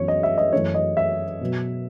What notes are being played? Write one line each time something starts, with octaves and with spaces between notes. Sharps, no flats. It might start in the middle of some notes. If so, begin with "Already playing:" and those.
Already playing: F#2 E3 G#3 B3 C#5
D#5
E5
D#5
F#2 E3 A3 C#4 C#5
D#5
E5
B2 F#3 B3